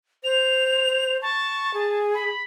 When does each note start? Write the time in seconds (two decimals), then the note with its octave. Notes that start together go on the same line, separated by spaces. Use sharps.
0.24 C5 F7
1.22 A5 C#6
1.74 G#4
2.14 B5